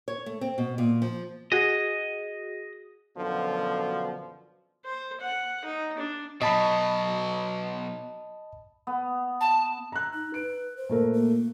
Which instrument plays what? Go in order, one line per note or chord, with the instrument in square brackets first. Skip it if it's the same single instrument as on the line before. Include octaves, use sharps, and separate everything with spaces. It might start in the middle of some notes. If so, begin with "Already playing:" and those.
[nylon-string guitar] C#5
A3
C4
B2
A#2
F3
[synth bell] F#4 G#4 [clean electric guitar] D#5
[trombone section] F#2 B2 D3 [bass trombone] F3
[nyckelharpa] C5
F#5
D#4
D4
[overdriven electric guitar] B2 F#3 [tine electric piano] D#5 A5 B5
[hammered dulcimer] B3
[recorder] A5
[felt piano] A#5 F#6
[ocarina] D#4
[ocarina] B4 [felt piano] D7
[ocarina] C5
[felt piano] A#2 A3 A#4
[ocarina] A#3